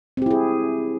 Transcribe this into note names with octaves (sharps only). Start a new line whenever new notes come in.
C4 E4 G4 G#4